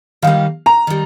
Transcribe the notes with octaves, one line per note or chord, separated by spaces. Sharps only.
D#3 G3 A#3 F5
A#5
D#3 G3